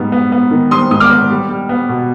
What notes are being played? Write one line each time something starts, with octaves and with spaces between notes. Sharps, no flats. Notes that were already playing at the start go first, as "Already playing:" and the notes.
Already playing: G#2 G3 B3
B3
B3
D#3
G3 C6 D#6
G#2 D#6
D6 F6
B3
G3
G3
B3
B2